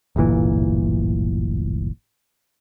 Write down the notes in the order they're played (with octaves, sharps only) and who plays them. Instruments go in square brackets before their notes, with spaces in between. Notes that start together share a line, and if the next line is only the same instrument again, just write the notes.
[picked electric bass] D1 G1 A#2 E3